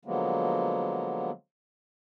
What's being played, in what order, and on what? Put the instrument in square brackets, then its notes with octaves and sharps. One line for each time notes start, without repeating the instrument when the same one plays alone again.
[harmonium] D3 F3 F#3 G#3 A#3 B3